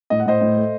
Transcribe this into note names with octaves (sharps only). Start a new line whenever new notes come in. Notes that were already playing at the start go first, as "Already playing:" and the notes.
A2 D#5
F#5
A2 C5 D#5
A2
A3